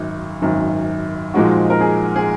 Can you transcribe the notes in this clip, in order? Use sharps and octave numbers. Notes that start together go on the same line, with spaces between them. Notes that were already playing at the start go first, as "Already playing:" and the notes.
Already playing: G#1 F#2 D#3
G#1 F#2 D#3
A#2 F3 G#3 D#4 F#4
A#4
G#4
G#4